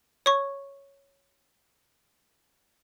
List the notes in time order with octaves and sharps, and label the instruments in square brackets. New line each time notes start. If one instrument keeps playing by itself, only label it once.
[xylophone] C#5 C#6